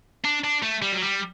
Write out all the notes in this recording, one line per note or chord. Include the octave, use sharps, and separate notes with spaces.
D4
D4
A3
G3
F#3
G3